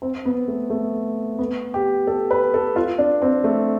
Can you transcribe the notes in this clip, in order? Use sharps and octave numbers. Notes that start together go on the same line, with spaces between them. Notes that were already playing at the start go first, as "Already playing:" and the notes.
C4
B3
A3
A3
B3
G4
A4
B4
A4
F4
D4
C4
A3